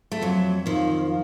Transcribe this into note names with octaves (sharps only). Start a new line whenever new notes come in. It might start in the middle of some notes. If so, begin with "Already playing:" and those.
A3
F2 F#3
D#3 F3